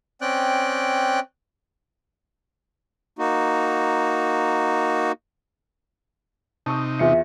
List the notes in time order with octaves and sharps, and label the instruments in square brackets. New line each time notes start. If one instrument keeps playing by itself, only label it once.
[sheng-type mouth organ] C4 C#4 D5 G5 F#6
[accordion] A#3 D#4 F#4
[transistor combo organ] C3 D#4 [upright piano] A5 C#6 D#6
[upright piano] E2 F4 C#7 [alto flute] E5